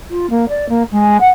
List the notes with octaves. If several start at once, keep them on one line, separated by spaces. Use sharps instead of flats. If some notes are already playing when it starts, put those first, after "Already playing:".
F4
A#3
D5
A#3
G#3
F#5